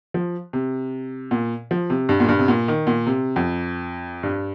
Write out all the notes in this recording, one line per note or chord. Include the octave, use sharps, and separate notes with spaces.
F3
C3
A#2
F3
C3
G2
A#2
G2
C3
A#2
D#3
A#2
C3
F2
G2